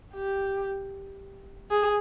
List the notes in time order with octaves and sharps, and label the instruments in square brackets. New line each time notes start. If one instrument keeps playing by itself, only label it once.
[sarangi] G4
G#4